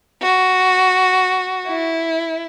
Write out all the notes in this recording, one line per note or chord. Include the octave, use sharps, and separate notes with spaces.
F#4
E4